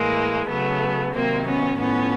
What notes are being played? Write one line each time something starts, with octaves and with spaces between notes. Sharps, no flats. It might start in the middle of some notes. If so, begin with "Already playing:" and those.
Already playing: A2 E3 G#3 A#3
C#3 F#3 A3 B3
C3 D#3 F#3 A#3 C4
B3 C#4
A2 F3 B3 C#4